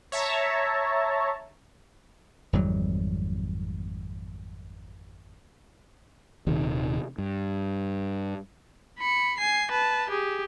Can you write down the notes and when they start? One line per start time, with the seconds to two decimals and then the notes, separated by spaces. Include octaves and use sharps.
0.12 C#5 E5 A5 A#5
2.53 G#1 F2 F#3 G3
6.47 D#1 C3 D#3
7.18 G2
8.99 B5 C#7
9.38 G#5 C7
9.71 B4 A5
10.10 G4 G#4